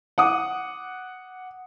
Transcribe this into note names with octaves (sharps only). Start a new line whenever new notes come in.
F#5 D6 D#6